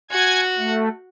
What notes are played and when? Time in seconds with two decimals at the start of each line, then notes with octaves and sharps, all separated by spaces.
0.11 F#4 F#5 G#5 G#6
0.58 A3